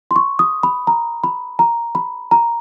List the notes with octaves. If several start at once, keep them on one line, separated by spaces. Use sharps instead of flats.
C6
C#6
D#6
B5
A#5
B5
A#5
B5
A#5